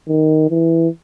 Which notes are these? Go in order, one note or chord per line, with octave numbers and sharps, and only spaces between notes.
D#3
E3